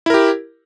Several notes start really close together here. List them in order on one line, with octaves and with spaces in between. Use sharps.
E4 A#4 G4